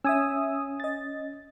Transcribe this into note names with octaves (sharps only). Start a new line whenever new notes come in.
C#4 E5 G#5 D#6 E6 G#6
D#5 A6